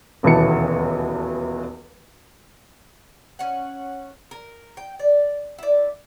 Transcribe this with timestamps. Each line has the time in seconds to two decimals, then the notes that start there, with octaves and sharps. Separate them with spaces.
0.23 D#1 B1 E2 E3 A5 C#7
3.39 C#4 F#5
4.31 A#4
4.77 G5
4.99 D5
5.58 E4 D5